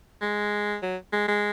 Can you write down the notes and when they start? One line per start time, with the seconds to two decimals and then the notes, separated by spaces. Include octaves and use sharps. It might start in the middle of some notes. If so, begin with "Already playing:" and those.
0.21 G#3
0.82 F#3
1.13 G#3
1.28 G#3